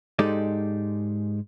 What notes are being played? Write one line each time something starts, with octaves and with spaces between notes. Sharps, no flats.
G#2 G#3 D#4 G4 A4 D5